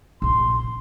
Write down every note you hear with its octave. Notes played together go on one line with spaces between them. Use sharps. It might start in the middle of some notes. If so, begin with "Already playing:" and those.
A#1 C#3 C6